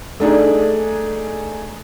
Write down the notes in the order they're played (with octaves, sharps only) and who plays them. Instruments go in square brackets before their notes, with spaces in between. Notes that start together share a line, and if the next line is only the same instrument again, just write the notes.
[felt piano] A3 D4 D#4 G#4